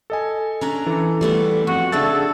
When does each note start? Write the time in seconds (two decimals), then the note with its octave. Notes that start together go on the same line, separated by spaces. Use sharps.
0.10 A4 D#5 G#5
0.61 C#4 D4 A#5
0.86 E3 A4
1.21 G3 A3 B3
1.67 F2 F#4
1.92 C#3 G#3 D4 F#4 A4 E5 A6